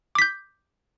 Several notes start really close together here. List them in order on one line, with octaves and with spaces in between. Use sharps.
D6 B6 G6